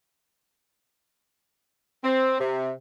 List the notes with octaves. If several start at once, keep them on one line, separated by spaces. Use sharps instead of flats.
C4
C3